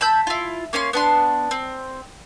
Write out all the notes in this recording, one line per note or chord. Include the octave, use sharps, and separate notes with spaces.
A5 B5 E6 G6
E4 F4
A#3 C#4 F5 C6
B3 D4 C6
C4